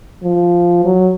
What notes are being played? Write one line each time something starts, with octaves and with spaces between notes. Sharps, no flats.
F3
F#3